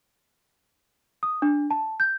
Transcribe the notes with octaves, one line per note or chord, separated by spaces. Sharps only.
D#6
D4
A5
G6